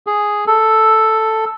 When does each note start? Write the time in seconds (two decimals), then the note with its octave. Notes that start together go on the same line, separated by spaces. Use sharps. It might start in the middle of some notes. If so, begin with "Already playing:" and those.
0.07 G#4
0.47 A4